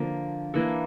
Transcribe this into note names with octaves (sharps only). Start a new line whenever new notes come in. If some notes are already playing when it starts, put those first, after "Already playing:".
Already playing: D3 F3 A#3
E3 A#3 D4 A4